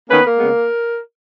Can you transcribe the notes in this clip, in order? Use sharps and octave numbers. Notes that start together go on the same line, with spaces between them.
D#3 A#3 B3 C#4 B4
A#3 A#4
C#3 G#3 B3